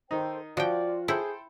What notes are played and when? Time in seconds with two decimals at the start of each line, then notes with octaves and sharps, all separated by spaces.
0.11 D#3 D#4 A4 C5 G5
0.57 F3 F4 F#4 D5 G5
1.08 E4 G#4 A4 C5 G5